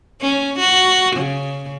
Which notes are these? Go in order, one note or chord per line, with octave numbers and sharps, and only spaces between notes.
C#4
F#4
C#3